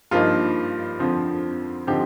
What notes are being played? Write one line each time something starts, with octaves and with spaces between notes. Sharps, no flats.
G2 F3 A#3 D#4 F4
F2 D3 F3 C4
D3 F3 C4 D#4 G4